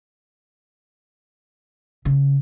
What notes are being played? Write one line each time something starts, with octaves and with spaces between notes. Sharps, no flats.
C#3